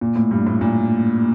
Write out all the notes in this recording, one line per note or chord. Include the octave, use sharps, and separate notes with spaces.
A#2
A2
G2
A2
A#2